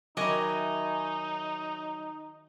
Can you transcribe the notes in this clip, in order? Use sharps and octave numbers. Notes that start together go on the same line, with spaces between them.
D#3 F#3 D#4 E4 D#5 G#5 D6